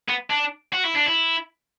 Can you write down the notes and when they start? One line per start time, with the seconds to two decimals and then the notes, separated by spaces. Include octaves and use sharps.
0.09 B3
0.30 D4
0.73 F#4
0.84 E4
0.95 D4
1.06 E4